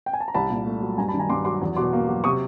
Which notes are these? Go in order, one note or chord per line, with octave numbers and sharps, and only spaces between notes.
G5
G#5
A5
A#5
C2 A5 B5
A#2
A3
F#3
G2 G#5 A#5
A5 B5
D#3
G#5 A#5
G2 C6 D6
F#3 C6 D6
E2
B2 C6 D6
A#3
F#3
C3 C#6 D#6